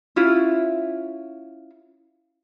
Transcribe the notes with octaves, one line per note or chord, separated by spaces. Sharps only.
C#4 E4 F4